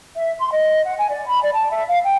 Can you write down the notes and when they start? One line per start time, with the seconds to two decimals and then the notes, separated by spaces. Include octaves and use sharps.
0.17 E5
0.40 C6
0.51 D#5
0.85 F#5
0.98 G#5
1.11 D5
1.25 B5
1.42 D5
1.53 A5
1.72 E5
1.88 F5
2.04 G5